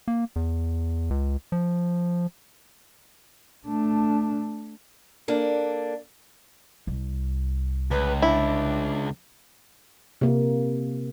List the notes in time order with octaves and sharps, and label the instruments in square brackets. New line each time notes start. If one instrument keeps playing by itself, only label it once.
[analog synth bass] A#3
E2
C#2
F3
[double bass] A3 D4
[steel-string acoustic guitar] A#3 D4 A4
[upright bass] C2
[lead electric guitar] C#2 [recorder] B4
[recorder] D4 [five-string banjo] E4
[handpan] C3 A#3